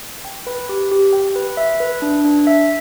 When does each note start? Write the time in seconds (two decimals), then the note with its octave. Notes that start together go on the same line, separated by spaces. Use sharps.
0.25 G5
0.47 B4
0.69 G4
0.92 G4
1.13 G5
1.35 B4
1.57 E5
1.80 B4
2.02 D4
2.24 D4
2.47 E5